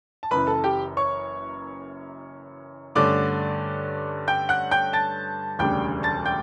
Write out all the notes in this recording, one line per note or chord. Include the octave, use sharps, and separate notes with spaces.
A5
F#1 F#2 E3 B4 B5
A4 A5
G4 G5
C#5 C#6
G2 D3 A3 C#4 D5 D6
G5 G6
F#5 F#6
G5 G6
A5 A6
E1 D2 C#3 G3 D4 G5 G6
A5 A6
G5 G6